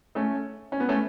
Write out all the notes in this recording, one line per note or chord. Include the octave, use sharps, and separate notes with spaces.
A3 C#4
C#4
B3
A3 C#4